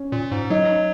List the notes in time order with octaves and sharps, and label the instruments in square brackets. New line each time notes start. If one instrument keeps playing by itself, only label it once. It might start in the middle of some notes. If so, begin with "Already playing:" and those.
Already playing: [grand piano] C#4
[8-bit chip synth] A#2
G#2
[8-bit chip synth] F#3 [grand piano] D#4